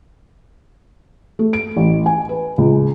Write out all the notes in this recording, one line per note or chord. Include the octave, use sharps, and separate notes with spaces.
A3
D7
A1
G#5
B4
C#2